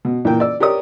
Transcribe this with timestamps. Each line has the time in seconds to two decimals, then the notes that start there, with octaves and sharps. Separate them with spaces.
0.05 B2
0.25 A#2 E3 A#3 G5
0.40 D5 E6
0.60 G4 A#4 C#5 D5 D#6